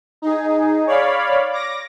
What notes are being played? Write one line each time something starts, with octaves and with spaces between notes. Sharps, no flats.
D#4 G#4
C#5 D5 F5 B5
D6 A#6